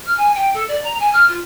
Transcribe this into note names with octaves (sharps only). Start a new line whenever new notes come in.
F6
G#5
G5
A4
D5
A#5
G#5
F6
F4